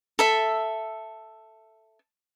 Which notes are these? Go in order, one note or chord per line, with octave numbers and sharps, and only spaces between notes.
A4 E5